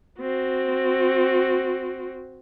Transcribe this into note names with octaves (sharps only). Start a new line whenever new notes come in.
C4 F#4